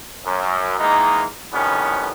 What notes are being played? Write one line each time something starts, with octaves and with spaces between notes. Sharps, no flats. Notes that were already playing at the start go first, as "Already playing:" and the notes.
F#2
D#3 E3 G#3 A#3 B3 D#4
F2 A2 D#3 G3 B3 C#4